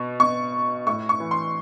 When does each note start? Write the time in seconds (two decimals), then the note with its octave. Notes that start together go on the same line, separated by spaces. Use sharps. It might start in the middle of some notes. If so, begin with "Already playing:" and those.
Already playing: B2 C#6
0.20 B2 C#6
0.87 A2 C#6
1.09 C#6
1.20 E3
1.31 C6